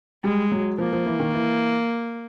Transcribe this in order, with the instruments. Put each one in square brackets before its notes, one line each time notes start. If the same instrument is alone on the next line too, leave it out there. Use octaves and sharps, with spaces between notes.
[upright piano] G3 [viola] G#3
[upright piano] F#3
[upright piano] F3 [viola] A#3
[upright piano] F3
E3
D#3
E3